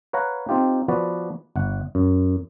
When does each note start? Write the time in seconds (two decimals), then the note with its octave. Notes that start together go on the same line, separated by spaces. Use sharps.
0.13 B4 C#5 F5 F#5 A#5
0.49 C4 D#4 F4 G4
0.88 F3 B3 F#4 B4 D5
1.56 G1 F#5
1.95 F#2